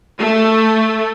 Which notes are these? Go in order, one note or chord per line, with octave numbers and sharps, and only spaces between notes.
A3